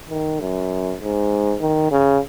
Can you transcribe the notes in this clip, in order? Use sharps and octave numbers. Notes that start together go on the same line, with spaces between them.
D#3
F#2
G#2
D#3
C#3